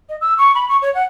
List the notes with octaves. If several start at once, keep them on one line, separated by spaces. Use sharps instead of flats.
D#5
E6
C#6
B5
C#6
C#5
F#5